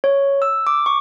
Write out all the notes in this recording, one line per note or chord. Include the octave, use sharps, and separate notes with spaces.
C#5
E6
D6
C#6